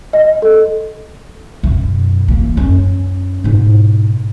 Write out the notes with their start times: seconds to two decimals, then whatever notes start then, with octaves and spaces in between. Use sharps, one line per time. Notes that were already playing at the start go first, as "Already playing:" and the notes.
0.13 D#5
0.42 A4
1.63 F#2 B2
2.28 E3 A#3
2.57 F#2 C#4
3.44 G#2 B2